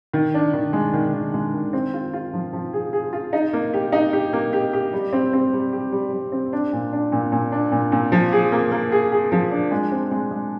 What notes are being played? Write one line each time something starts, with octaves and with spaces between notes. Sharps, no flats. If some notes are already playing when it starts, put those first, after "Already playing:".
D#3
D4
D#3
G#3
D#3
D#3
G#3
D#3
C4
F4
F4
F3
F3
G#4
G#4
F4
D#4
A#3
G4
D#4
G4
A#3
G4
G4
G3
C4
C4
G3
G4
G3
G3
C4
D4
A#2
D4
A#2
A#2
D4
A#2
A#2
F3
G#4
A#3
A#3
G#4
G#4
F3
D4
G#3
C4
G#3
G#3